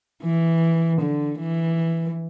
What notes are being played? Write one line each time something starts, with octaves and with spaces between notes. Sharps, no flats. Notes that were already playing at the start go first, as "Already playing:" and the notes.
E3
D3
E3